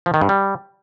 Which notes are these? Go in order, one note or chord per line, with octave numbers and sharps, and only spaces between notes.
F3
D#3
G2
G3